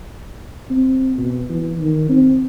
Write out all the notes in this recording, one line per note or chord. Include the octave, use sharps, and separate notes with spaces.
C4
B2
E3
D#3
C4